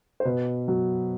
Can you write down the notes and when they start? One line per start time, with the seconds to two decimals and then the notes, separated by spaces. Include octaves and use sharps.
0.20 C5
0.25 B2 B4
0.68 F#3